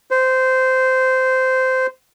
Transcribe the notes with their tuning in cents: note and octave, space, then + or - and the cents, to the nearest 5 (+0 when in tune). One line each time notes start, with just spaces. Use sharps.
C5 -15